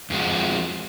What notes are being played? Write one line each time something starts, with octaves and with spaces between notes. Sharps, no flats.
F2 F3 G#3 F#4